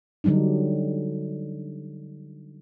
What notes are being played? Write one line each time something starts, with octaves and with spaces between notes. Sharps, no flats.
D3 F#3 G3 D4 D#4